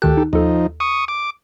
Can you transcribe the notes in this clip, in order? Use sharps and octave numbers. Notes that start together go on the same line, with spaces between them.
D2 D#3 G4 A4 F#6
D#4
D#2 F3 D#4 A4
C#6 D#6
D6